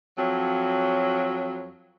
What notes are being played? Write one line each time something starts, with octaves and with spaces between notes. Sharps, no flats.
F2 F#3